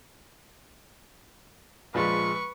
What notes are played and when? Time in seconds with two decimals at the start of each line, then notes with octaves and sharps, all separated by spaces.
1.94 A#1 F3 G#3 B4 C#6